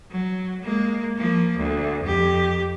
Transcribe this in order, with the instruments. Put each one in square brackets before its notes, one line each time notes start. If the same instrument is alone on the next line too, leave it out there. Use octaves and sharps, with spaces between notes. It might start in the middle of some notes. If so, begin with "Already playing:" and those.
[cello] F#3
G#3 A#3
F3 A#3
D2
F2 G4